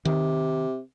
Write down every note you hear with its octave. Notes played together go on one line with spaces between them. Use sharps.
C3 D#3